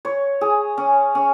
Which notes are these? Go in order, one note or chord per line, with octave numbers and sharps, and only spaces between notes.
C#5
G#4
C#4
C#4